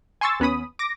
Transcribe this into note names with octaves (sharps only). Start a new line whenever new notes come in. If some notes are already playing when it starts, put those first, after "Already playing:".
G#5 C6 C#6 E6 A6
D#2 B3 C#4 B5 D#6
D6 A#6